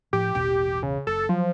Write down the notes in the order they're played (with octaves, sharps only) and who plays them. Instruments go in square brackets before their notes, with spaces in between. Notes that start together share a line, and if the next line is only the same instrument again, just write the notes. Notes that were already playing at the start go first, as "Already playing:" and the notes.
[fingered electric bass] A2 F3 [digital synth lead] G4
[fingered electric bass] A1 E2 B2 [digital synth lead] G4
[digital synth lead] C#3
[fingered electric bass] F#1 [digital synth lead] A4
[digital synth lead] F3 [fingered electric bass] F#3